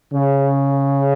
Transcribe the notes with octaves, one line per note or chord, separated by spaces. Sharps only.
C#3